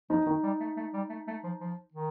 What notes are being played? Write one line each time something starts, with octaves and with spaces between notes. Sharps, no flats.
F3 D#4
D#3 D#4
G3
A3
A3
G3
A3
A3
F3
F3
D#3